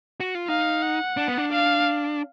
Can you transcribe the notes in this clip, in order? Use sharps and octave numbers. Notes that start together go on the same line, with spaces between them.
F#4
F4
D#4 F5
F#5
D4
B3
D4
F5